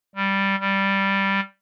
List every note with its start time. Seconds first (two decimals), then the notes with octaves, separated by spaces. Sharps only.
0.16 G3
0.60 G3